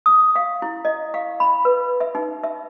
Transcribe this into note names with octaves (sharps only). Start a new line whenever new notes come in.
D#6
F5
E4
D#5
F5
B5
B4
E5
D#4
E5